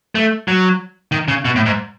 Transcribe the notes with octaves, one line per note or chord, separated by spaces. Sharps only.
A3
F#3
D#3
C#3
B2
A2
G#2